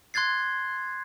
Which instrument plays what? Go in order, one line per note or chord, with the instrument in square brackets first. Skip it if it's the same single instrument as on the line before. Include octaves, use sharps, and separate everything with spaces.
[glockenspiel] C6 F#6 G#6 A6 C7